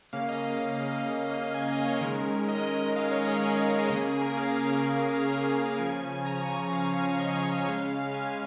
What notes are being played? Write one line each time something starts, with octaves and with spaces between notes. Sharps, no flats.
C#3 A#3 C#4 F5
D#5
F5
F5
G#5
D#5
C#5
D#3 G#3 C#4 A#4
D#5
F5
C#5
G#4
A#4
C#3 A#3 C#4 G#4
G#4
A#4
F5
C#3 F3 C#4 G#5
A#5
C#6
G#5
F5
D#5
C#5
D#5
C#3 G#3 C#4 F5
F5
G#5